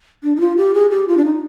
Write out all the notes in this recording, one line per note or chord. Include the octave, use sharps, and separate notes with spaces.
D4
D#4
F4
G4
G#4
G4
F4
D4
D#4